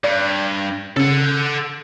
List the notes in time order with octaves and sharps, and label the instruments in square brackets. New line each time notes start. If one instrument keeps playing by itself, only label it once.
[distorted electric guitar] G2 [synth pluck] D5
[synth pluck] C#3 [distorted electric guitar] A4 F#5
[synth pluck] G6